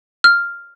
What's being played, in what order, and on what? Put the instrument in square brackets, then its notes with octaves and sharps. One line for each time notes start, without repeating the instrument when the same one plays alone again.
[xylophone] F6